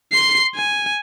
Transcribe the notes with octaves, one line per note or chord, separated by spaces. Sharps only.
C6 C7
G#5